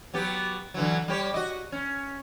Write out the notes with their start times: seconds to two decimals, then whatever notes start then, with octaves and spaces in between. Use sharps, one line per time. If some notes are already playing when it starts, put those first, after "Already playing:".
0.14 F#3 B3 G4
0.74 D3 E3 F#3
1.08 G3 G4 C#5
1.34 F#4 D#5
1.72 C#4